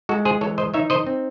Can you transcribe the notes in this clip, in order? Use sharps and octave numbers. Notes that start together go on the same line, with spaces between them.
G#3 F#4 A4
G#4 C5
E3 A4 C#5
C5 D#5
D#4 C#5 E5
C5 D#5
C4